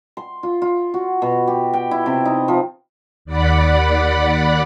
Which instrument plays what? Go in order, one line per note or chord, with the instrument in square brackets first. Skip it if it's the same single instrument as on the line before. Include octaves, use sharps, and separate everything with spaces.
[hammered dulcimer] C6
F4
F4
F#4
B2
G4
G5
E4
C3
D#4
F3
[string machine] D#2 D5 F#5 B5